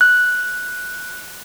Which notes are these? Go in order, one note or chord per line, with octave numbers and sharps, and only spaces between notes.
F#6